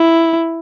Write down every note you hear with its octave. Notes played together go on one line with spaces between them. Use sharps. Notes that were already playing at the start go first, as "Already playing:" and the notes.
Already playing: E4